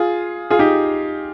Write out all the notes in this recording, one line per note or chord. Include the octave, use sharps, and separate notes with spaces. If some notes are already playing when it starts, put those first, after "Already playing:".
Already playing: F4 G#4
F4 G#4
D#4 G4